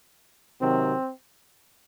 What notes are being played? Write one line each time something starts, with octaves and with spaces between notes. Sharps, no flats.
C3 D#3 F#3 C4